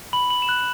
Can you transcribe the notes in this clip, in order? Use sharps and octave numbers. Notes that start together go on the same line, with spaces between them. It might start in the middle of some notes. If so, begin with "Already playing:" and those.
B5 F#7
F#7
E7
F#6 F#7